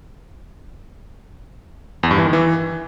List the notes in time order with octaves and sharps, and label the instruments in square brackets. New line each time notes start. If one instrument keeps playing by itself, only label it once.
[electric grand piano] E2
G2
E3
D#3
E3